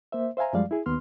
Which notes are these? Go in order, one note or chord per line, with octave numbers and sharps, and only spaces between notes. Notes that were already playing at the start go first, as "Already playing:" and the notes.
A#3 C5 E5
C5 E5 F5 G#5 A#5
F#2 F3 G3 G#3 D5 F5
E4 G#4
D#2 B3 C6 F6